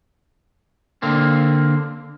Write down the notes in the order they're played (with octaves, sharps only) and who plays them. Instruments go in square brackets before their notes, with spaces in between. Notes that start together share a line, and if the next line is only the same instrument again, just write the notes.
[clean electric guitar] D3 A#3 C4